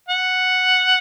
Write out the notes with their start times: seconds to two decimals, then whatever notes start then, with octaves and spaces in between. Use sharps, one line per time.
0.09 F#5